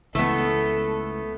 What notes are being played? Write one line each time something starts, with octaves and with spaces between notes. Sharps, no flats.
C#2 E3 A3 B3 A4